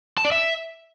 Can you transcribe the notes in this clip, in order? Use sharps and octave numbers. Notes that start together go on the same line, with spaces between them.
A5
D5
E5